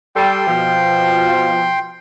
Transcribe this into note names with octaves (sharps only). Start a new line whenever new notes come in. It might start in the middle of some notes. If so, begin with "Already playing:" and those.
G3 A4 G5 C6
B2 F3